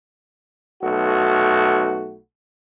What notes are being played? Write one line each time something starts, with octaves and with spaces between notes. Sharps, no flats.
B1 A3 F#4